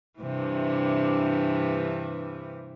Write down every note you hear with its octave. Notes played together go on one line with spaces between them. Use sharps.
G2 C3 E3